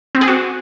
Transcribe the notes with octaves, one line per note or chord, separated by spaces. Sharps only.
C4
G#4
F#4